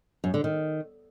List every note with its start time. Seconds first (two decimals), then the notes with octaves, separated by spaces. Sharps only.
0.24 F#2
0.34 D3
0.44 D#3